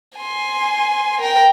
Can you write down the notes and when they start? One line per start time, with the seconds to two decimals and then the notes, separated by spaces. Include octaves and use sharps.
0.17 G#5 C6
1.21 A#4 G5